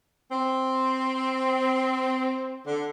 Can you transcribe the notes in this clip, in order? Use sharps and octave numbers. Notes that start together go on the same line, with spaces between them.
C4
D3